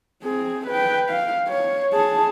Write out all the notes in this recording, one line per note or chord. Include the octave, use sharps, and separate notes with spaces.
C4 G#4
B4 G5
F5
C#5
G#4 A5